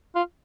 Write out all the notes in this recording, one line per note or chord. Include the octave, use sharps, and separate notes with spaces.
F4